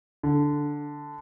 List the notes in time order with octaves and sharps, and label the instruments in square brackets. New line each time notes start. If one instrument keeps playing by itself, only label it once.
[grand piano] D3